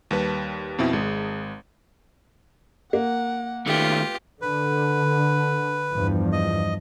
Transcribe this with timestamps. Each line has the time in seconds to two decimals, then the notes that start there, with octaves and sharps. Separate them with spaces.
0.11 D#2 G3 B4 A5
0.78 F2 B2 C4 E4
0.93 G#1 G#3 G#4
2.93 A#3 F#5
3.66 D#3 A3 F4 G4 B4
4.42 D3 B4
5.92 E2 G2 F3
6.32 D#5